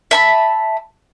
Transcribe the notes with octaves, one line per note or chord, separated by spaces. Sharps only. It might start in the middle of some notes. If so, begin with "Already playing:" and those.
E5 A5 B5